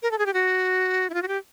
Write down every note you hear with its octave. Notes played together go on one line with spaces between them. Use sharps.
A#4
A4
G#4
G4
F#4
E4
F4
F#4
G4